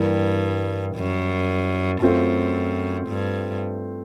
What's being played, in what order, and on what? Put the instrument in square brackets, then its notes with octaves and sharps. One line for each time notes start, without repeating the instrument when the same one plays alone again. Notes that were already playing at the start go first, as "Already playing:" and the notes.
Already playing: [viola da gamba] G2 [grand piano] E3 G3 A#3
[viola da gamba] F#2
[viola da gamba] F#2 [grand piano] A3 C4 F4
[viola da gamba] G2